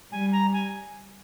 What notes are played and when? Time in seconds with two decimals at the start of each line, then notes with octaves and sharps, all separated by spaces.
0.12 G3 G#5
0.32 A#5
0.53 G#5